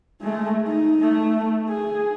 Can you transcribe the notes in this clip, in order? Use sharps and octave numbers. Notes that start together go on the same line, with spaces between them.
G#3 A3
D#4
A3
G#4